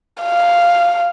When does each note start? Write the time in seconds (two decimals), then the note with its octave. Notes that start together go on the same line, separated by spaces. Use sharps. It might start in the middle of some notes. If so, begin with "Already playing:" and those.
0.22 F5